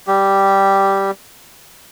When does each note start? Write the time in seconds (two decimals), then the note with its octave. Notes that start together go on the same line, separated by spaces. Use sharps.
0.07 G3 G4